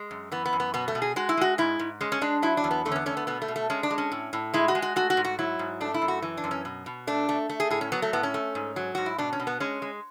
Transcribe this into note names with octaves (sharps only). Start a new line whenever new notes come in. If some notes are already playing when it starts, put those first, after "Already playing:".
Already playing: G#3
F#2
E3 B3
B3
F#2
B3
B2 B3
A3
B2
G#4
G#3 F#4
E4
G#3 F#4
G#2 E4
G#2
G#3 C#4
C#4
G#3 D4
F#3 E4
D4
E2
B3
D3 A3
C#4
B3
A3 C#4
B3
B2 B3
A3
B2
A3
G#3 C#4
D4
G#3
C#4
A2
A2
G#3 E4
F#4
G#3
F#4
A3 F#4
F#4
G#2
F#4
F#3 E4
G#2
A3 D4
E4
F#2
F#4
E3
D4
F#2
C#4
B2
B2
A3 D4
A3
A3
G#4
A2 G#4
C#4
F#3 B3
A3
A2 B3
C#4
A3
G#2
F#3
G#2 F#4
E4
B2 D4
C#4
B2
B3
G#3 C#4
G#3